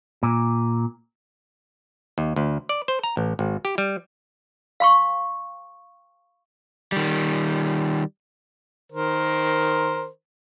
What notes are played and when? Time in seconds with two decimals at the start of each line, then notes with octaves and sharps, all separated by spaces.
0.23 A#2
2.18 D#2
2.36 D2
2.69 D5
2.88 C5
3.04 A#5
3.17 A1
3.39 G#1
3.65 G4
3.78 G3
4.80 F5 C6 C#6
6.92 D#3 G3
8.92 D#3 A#4 C5